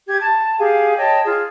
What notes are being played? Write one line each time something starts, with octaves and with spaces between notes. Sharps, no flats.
G4 G#6
A5
G4 G#4 F5 G#5
C#5 D#5 G5 A5
F4 G#4